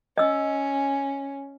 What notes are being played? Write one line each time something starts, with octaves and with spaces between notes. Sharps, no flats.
C#4 D#5 E6